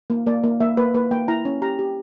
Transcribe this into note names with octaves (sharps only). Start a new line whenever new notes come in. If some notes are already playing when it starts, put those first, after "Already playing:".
A#3
A#3 D5
A#3
A#3 E5
A#3 B4
A#3 B4
A#3 G5
E4 A#5
C#4
G4 A#5
G4